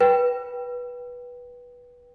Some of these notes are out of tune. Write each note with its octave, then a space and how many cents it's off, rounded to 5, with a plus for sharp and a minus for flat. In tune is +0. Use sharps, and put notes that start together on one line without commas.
B4 -15 G5 +0